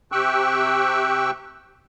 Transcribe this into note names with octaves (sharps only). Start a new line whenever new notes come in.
C3 G4 G5 C#6 E6 F#6